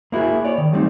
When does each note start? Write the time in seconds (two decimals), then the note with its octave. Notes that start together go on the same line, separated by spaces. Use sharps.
0.12 A#3 E4 F#4 G#4
0.44 C#5 D5
0.58 D#3
0.73 F#3 G3 A3 C4 D4 D#4